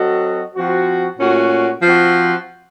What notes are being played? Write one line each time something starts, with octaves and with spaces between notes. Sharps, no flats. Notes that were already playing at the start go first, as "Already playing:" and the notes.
Already playing: F#3 C4 F#4 A4 D#5
F3 C4 F#4
A#2 A3 C#4 F#4
F3 C4 F#4